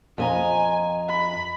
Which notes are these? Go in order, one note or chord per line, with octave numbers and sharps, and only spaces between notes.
F2 D#5 G#5 A#5
B5